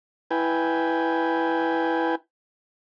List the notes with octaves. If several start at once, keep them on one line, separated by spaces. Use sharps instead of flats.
E4 B4 G5 G#5